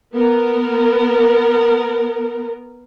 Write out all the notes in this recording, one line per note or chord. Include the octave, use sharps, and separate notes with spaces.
B3 A#4